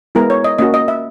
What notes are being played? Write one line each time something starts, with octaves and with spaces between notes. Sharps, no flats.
G#3 B3 E4 A#4
C#5
D#5
A#3 C#4 F#4 D#5
D#5
E5